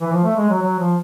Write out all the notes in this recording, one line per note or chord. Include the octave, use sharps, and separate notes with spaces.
E3
F3
A3
G#3
F#3
F#3
F3